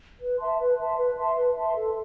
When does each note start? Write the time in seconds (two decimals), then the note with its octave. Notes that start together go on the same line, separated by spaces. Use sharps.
0.20 B4
0.39 E5 A5 C6
0.59 B4
0.79 E5 A5 C6
0.97 B4
1.17 E5 A5 C6
1.36 B4
1.56 E5 A5 C6
1.75 A4